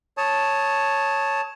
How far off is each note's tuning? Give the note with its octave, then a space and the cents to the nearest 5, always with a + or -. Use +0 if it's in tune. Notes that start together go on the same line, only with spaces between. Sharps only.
C#5 +0 A5 +0 D#6 +20